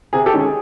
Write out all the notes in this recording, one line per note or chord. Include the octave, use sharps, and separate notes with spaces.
C3 G#4
G4 A4
D#3 G#3 C#4
G#4